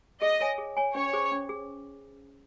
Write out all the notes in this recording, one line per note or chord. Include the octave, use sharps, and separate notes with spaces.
G#4 D#5
C#5 G#5
G#4
C#5 G#5
C#4 C#5
G#4 C5
C#4
G#4